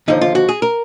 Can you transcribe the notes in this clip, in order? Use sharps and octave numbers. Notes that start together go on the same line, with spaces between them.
D#2 D3 F3 D#4
F4
F#4
G#4
A#4